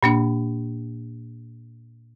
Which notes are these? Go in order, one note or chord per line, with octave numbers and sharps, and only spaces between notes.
A#2 A#3 D4